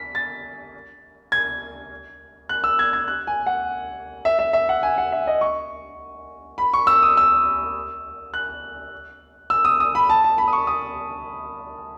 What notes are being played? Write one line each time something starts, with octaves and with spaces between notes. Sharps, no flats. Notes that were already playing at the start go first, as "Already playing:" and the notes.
Already playing: B6
A6
G#6
F#6
E6
G#6
G#6
F#6
G#5
F#5
E5
E5
E5
F#5
G#5
F#5
E5
D#5
C#6
B5
C#6
E6
D#6
E6
F#6
E6
D#6
D#6
B5
A5
A5
B5
D#6
C#6
D#6